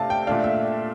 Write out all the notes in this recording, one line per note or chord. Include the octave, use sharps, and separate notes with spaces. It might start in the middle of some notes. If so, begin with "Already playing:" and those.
Already playing: C3 A3 D4 F5 A5
G5
A#2 A3 D4 F5
E5